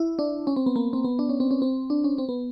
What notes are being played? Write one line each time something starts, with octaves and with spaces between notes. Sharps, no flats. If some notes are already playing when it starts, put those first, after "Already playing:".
Already playing: E4
D4
C#4
C4
B3
A#3
C4
B3
D4
C#4
C4
C#4
C4
D4
C#4
C4
B3